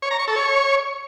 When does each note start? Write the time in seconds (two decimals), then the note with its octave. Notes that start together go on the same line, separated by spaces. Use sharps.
0.02 C#5
0.11 A#5
0.19 C#6
0.28 A4
0.36 C#5